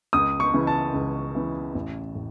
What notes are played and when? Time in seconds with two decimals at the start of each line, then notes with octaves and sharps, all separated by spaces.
0.13 C#2 D#6
0.40 C#6
0.54 C#3 E3
0.67 A5
0.94 C#2
1.35 C#3 E3
1.75 A1
2.15 A2